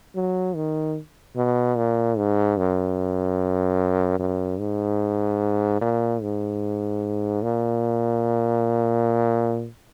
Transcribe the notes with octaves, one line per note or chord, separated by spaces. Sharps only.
F#3
D#3
B2
A#2
G#2
F#2
F#2
G#2
A#2
G#2
A#2